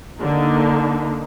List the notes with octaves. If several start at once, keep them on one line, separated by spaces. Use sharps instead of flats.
D3 A#3 D#4